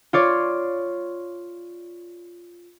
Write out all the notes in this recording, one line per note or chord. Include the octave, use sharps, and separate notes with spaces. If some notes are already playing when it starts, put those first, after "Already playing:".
F4 C#5 D5